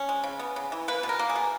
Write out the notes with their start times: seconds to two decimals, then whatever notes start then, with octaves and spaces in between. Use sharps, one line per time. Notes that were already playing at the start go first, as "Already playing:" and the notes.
Already playing: C#4
0.09 G#3
0.24 C#3
0.39 B3
0.56 C#3
0.72 E3
0.88 A#3 B4
1.03 B2
1.09 A#4
1.19 A#3
1.29 G#4
1.36 B2